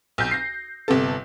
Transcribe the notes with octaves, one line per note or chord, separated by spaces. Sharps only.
B1 G6
A#6 C7
G1 C3 B3 A4